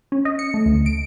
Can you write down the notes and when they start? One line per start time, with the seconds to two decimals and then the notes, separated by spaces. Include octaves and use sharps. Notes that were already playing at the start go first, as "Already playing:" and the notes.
0.12 C#4
0.25 D#5
0.39 C#7
0.54 A3
0.66 D2
0.86 D7